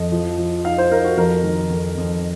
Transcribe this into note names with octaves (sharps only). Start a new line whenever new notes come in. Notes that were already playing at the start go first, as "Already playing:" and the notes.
Already playing: F2 D#5
F3
F3
D#4 F5
C5
D#4 A#4
F#4
F2 A#4
D#3
F2
F2